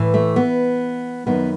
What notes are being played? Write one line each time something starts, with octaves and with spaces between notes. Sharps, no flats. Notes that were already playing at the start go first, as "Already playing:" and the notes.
Already playing: A2 E3
A3
B3
F#2 D#3 B3